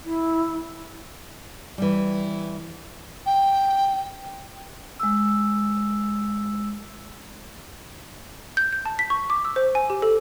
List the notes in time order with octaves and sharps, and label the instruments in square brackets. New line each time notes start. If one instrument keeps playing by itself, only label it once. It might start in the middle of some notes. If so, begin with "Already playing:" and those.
[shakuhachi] E4
[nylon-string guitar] E3 G3
[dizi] G5
[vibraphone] G#3 E6
[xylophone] G6
G6
A5
B6
C#6
D6
E6
C5
G#5
G4
A4